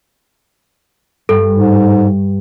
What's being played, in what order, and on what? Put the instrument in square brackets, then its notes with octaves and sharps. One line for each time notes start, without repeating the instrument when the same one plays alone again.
[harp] G2 [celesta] A4
[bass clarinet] G#2